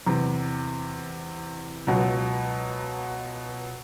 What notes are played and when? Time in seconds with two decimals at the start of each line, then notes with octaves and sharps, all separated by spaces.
0.07 E2 C3 E3
1.87 C#2 B2 F#3